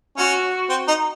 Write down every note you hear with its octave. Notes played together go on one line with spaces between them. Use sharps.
C#4 F#4
C4
D#4